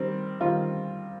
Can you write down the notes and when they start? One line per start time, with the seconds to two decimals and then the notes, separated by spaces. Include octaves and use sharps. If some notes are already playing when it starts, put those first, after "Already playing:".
Already playing: D#3 G3 C4
0.40 D#3 G3 C4 F4